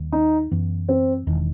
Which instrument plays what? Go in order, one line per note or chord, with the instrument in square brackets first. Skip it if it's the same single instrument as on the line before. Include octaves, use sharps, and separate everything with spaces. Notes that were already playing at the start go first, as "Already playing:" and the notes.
Already playing: [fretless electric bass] D#2 D#3 G3
[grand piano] D#4
[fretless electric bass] F#2 E3 B3
[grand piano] C4
[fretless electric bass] E1 E2 D#3